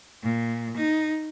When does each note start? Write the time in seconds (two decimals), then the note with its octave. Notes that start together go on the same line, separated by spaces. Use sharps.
0.23 A#2
0.77 D#4